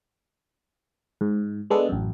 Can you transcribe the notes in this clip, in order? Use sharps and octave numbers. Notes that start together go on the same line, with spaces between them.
G#2
G#3 B3 D4 A4
A1 F#2